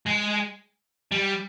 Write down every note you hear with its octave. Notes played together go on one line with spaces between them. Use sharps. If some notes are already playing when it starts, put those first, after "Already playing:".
G#3
G3